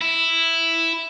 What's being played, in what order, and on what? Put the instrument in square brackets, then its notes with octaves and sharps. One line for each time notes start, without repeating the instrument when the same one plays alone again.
[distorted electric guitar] E4